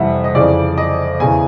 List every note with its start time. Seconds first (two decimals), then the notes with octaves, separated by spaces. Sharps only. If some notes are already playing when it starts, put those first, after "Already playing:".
Already playing: F2 C3 E3 G3 E5 F#5
0.24 D#5
0.35 F2 C#3 E3 D5
0.78 D#5
1.20 E2 C#3 E3 G#5